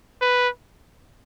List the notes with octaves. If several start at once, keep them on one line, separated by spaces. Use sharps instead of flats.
B4